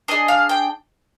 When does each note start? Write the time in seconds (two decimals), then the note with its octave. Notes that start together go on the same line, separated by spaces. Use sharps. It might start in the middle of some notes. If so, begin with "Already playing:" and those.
0.08 D4 G#4 D#5
0.28 F5
0.49 G5